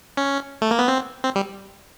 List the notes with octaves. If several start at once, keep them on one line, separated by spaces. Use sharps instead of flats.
C#4
A3
A#3
B3
C4
C4
G3